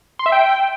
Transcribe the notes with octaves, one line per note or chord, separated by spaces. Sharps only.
C6
E5
G5